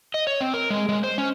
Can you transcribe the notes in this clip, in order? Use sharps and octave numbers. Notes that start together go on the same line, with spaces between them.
D#5
C#5
C4
A#4
G#3
G#3
C5
C#4